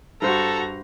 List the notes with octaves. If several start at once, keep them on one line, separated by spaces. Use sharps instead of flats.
G2 F#4 A4 C5 A#5